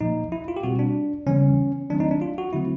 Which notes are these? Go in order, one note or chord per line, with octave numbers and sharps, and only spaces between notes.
A#2 F3 A#3 D#4
E4
F4
G4
B2 G3 C4 F#4
D4
C#3 E3 G3 B3 C#4
D#3 F#3 A3 C4 D4
D#4
D4
F4
F#4
D3 F#3 A3 C4 E4